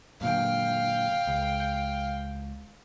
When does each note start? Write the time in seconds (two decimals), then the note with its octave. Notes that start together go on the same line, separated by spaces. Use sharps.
0.21 F#2 A#2 D3 F5 G5
1.27 C#2